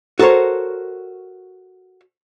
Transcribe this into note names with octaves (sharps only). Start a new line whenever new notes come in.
F#4 A4 A#4 C5 C#5